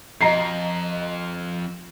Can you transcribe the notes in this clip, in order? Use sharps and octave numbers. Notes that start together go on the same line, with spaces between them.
F2 D#5 A#5 C7